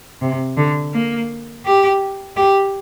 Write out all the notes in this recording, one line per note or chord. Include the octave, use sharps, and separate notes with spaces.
C3
D3
A#3
G4
G4